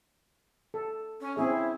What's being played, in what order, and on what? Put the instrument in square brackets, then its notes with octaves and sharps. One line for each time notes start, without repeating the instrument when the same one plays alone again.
[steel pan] A4
[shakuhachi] C#4
[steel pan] C4 C#4 G#4 [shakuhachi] E4